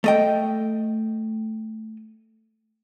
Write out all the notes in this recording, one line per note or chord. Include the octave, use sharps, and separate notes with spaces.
A3 D#5 G5